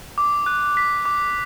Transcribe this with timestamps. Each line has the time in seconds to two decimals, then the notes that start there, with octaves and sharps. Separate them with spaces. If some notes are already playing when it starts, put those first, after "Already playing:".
0.18 D6
0.46 F#6
0.77 B6
1.05 D6